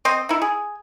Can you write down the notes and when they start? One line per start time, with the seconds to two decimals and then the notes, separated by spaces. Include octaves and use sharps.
0.05 C4 C5 D#5
0.29 D#4 E4
0.42 G#4